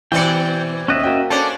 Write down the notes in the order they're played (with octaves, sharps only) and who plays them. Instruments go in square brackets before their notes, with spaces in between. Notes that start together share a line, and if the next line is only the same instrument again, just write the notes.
[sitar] B2 C4 D5 [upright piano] E3 C#7 [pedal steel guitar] G5
[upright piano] D#2 F#6 [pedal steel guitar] C#4 D#5 E5
[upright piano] A#3 F#4 G5
[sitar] C#4 D4 C5 [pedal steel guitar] A4 D5